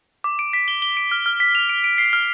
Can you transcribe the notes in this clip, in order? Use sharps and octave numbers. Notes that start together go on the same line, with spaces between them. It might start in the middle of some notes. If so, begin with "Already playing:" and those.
D6
D7
B6
G7
G7
D7
F6
F6
B6
F7
D7
D7
C7
F6